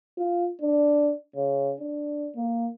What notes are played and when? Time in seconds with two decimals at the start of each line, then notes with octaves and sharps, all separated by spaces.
0.17 F4
0.61 D4
1.36 C#3
1.80 D4
2.35 A#3